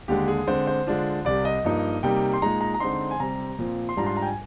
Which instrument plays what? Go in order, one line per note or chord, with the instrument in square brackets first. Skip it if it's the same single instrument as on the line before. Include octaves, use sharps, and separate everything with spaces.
[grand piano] D#2 D3 G#3 G4
G#4
D3 G#3 C4 C5
C5
D3 G#3 D4 F4
C2 C3 G3 D5
D#5
G2 F3 A#3 D#4
C3 G3 A#3 D#4 G5
C6
A#2 G#3 D#4 A#5
A#5
A#5
D3 G#3 C4 D#4 C6
G#5
C3 G3 C4 A#5
A#2 F3 C4
C6
G#2 G3 D4 F4 A#5
C6
A#5
G5
G#5